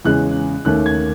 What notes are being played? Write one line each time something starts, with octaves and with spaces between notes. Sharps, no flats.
E2 C#3 G#3 C#4 F#6
D#2 D#3 A3 C#4 F#6
G#6